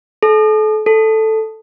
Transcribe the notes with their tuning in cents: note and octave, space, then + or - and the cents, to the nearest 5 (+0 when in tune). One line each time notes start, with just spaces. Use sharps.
A4 -35
A4 +0